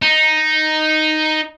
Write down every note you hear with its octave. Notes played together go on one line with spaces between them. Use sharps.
D#4